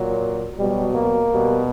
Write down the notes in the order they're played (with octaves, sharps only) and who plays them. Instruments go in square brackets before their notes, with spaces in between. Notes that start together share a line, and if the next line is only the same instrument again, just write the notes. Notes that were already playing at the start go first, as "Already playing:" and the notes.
Already playing: [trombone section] A#2 F#3
B2 F#3 G3
A#3
B2 G3